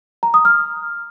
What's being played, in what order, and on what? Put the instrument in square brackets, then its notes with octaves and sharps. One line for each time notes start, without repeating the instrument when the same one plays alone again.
[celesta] A#5
D#6
F6